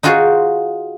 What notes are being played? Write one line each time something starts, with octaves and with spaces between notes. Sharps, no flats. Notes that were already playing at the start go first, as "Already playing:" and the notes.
D#4 F4 F#4 G#4 C5